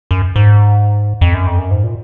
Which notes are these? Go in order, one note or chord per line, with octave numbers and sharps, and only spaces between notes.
F#2
G#2
F2
F#2
F2
F#2
G#2
A#2